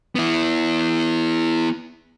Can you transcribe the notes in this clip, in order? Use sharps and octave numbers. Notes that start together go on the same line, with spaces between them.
B3 E4